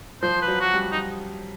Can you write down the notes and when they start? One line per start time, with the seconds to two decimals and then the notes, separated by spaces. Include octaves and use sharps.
0.22 F3 C5
0.42 B4
0.48 F#3
0.61 F#4
0.73 G3
0.92 D#4